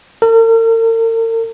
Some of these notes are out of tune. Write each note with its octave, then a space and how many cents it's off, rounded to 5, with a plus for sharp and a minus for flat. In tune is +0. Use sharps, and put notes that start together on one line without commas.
A#4 -45